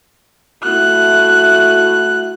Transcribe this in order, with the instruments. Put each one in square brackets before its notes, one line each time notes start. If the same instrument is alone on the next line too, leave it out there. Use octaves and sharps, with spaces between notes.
[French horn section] A3 E4 F#4 [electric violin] F#6